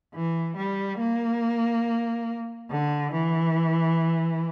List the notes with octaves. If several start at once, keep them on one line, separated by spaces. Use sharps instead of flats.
E3
G3
A#3
D3
E3